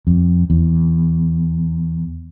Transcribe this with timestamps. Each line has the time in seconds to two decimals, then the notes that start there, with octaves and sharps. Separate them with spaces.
0.07 F2
0.50 E2